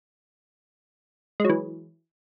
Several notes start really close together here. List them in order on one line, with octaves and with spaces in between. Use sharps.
G#3 F#3 E3